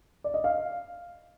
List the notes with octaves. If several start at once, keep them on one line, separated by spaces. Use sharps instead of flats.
D5
D#5
F5